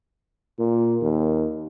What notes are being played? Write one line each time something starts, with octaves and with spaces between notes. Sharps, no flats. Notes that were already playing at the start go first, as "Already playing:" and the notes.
A#2
D#2